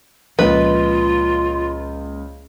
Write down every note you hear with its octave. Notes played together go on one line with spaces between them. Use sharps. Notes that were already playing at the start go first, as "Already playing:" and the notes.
C#2 A#2 F3 F4 B4 D#5